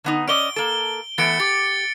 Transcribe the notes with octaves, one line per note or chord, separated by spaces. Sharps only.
D3 B3 D#4
C#4 D5 D#5 D7 G7
A#3 A4 D7
E3 A3 B3 A6 C#7 D7
G4 A6